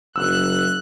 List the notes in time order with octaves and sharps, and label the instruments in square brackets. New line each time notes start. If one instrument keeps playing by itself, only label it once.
[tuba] F#1 [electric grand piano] E6 [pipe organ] F#6